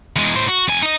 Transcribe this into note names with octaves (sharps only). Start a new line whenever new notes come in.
E2 G#3
A2 C5
F#4
F2 G#5
D#4 D#5